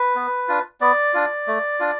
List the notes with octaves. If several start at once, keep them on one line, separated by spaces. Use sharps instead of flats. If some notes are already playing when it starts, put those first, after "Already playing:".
Already playing: B4
B3
D4 F4
B3 D5
D4 F4
A3
D4 F4